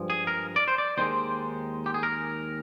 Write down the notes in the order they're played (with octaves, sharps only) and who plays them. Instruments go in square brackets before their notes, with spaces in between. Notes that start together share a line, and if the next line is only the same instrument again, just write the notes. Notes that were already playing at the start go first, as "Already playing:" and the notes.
Already playing: [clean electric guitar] G2 F3 G#3
G#4
A#4
D5
C5
D5
D#2 D#3 G#3 C5
G4
G#4
A#4